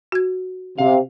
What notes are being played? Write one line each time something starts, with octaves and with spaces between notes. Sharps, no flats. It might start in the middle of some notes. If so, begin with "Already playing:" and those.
F#4 G#6
C3 F5